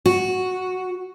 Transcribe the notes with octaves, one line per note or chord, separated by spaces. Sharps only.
F#4